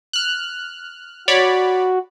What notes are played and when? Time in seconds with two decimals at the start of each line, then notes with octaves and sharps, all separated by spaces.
0.13 F6 F#6
1.28 F#4 C#5 D5 B5